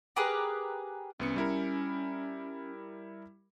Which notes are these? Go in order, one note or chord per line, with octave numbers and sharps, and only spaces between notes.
G4 G#4 A#4 B4
C2 B3 C#4 C#7
G3 E4 A#4